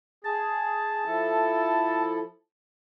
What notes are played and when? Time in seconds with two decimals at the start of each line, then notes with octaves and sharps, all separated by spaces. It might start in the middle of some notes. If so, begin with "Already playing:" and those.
0.24 G#4 A5
1.06 F3 E4 A4